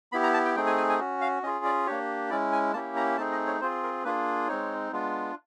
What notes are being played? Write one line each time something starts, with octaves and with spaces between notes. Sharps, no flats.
B3 E4 G4 B5
A#5
A5
G5
A3 C4 D#4 G#4 G5
G#5
G#5
G#5
C#4 F#4
F5
C#4 F4 G#4 D#5
D5
A#3 D4 G4 C#5
G#3 C#4 E4 D5
G#5
A#3 C#4 E4 G4 A5
A#5
A3 C4 D#4 G#4 A5
D#5
C#5
C4 F4 G#4 C5
A#4
A#3 D4 F4 G#4 B4
G#3 C4 D#4 C#5
G#3 B3 D4 F4